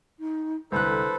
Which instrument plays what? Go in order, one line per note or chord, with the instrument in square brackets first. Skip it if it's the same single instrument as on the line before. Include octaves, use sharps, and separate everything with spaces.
[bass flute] D#4
[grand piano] C2 F#6 [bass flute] D3 [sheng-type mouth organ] A4 B4 C5